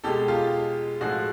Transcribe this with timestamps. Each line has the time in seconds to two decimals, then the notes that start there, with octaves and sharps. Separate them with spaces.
0.04 B2 G4 A4
0.07 G#3
0.28 F4 G4
1.01 A2 F3 G#3 F#4 G#4